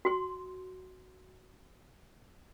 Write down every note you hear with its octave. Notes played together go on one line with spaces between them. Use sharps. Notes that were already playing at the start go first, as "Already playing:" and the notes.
F#4 C6